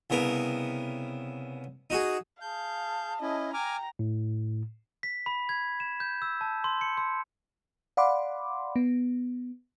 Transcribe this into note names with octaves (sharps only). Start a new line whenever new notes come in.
C2 C#3 B3 A#4
D#4 F#4 G#4
G#4 F5 A5 G6
C#4 E4 D#5
G5 G#5 A#5 D6 F6
A2
B6
B5
G#6
E7
G6
E6
A5
C6
C#7
C6
D5 F5 F#5 B5 C6 D6
B3